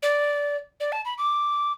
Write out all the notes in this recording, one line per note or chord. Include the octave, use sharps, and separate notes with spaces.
D5
D5
A5
B5
D6